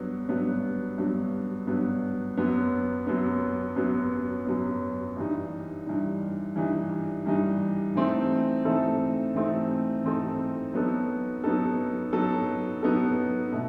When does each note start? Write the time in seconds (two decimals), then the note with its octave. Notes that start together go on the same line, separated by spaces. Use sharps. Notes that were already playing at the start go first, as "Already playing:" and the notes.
Already playing: G2 F#3 B3
0.29 G2 F#3 B3
0.98 G2 F#3 B3
1.67 G2 F#3 B3
2.37 F#2 F#3 B3
3.07 F#2 F#3 B3
3.76 F#2 F#3 B3
4.46 F#2 F#3 B3
5.17 G2 E3 G3 D#4
5.86 G2 E3 G3 D#4
6.56 G2 E3 G3 D#4
7.26 G2 E3 G3 D#4
7.95 E3 A3 C4 D#4 A4
8.65 E3 A3 C4 D#4 A4
9.35 E3 A3 C4 D#4 A4
10.04 E3 A3 C4 D#4 A4
10.74 F#3 B3 D#4 A4
11.44 F#3 B3 D#4 A4
12.13 F#3 B3 D#4 A4
12.83 F#3 B3 D#4 A4
13.52 B2 A3